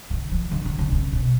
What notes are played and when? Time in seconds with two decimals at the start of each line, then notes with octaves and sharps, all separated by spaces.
0.10 D3
0.31 F3
0.51 D3
0.65 D3
0.79 D3
0.92 C#3
1.13 B2